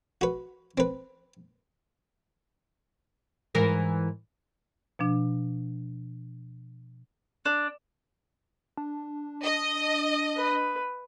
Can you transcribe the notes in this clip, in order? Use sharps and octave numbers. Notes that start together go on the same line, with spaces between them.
F#4 B4
C4 B4
G#2 E3 A#4
B2 F3 D4
D4
D4
D#5
B4